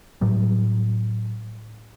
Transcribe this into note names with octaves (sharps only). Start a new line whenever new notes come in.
A2 F#3 G3